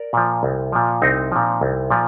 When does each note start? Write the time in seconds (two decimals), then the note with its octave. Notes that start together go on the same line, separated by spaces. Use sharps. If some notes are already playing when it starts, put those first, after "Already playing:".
Already playing: A#4 D5
0.13 A#2 F3
0.43 C2
0.72 A#2 F3
1.02 C2 C4 D#4
1.32 A#2 F3
1.61 C2
1.90 A#2 F3